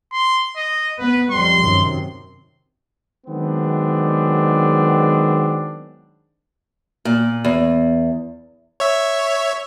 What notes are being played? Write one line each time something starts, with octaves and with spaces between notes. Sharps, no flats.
C6
D#5
B3 B4
F2 G3 C6
F#2 C3 D#3
D#3 F#3 G#3 B3 C4 D4
A#2
E2
C#5 E5